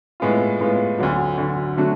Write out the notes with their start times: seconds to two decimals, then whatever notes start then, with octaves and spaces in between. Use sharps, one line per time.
0.20 A2 G#3 B3 F4
0.60 A2 G#3 B3 F4
0.99 D2 D3 F#3
1.38 D2 D3 F#3
1.77 D3 F#3 A3 D4 F#4